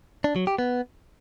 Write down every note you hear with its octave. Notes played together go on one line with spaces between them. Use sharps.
D4
F#3
G4
B3